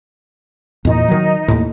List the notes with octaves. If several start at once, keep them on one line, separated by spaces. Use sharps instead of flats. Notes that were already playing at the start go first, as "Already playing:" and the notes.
E2 A#2 D#4
D#3 F#3
D#2 A2